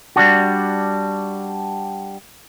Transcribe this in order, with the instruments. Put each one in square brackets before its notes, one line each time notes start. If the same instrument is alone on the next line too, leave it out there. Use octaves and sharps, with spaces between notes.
[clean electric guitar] G3 D4 F#4